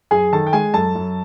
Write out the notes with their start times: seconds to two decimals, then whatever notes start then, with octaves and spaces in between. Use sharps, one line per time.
0.11 F#2 G#4 G#5
0.33 D#3 A4 A5
0.47 G5
0.53 G#3 G#4 G#5
0.74 F#2 A4 A5
0.95 F#2